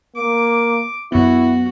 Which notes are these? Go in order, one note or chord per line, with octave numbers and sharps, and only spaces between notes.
A#3 D6
F#2 B3 E4 F#4